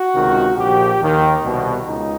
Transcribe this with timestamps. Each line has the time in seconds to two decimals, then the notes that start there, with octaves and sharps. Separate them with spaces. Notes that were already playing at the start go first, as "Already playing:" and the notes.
Already playing: F#4
0.14 C#2 C3 D#3
0.56 A#1 A#2 F3 G4
0.99 D#2 D#3
1.42 C2 B2
1.85 C#2 D#4